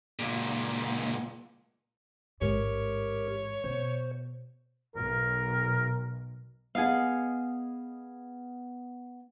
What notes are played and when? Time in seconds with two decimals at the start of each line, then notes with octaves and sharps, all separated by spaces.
0.19 C#2 A#2
2.41 A1 G#2 G4 A#4 C#5
3.64 B2 B3 C5
4.96 B1 A#4
6.75 B3 G#4 D#5 F5 F#5 G#5